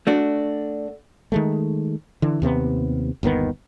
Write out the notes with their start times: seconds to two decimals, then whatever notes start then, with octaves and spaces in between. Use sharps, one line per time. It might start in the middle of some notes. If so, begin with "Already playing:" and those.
0.07 A3 D4 F#4
1.32 D#3 G#3 A3
2.22 D3 E3
2.42 D#2 C3 A3 B3
3.23 G1 D#2 D#3 B3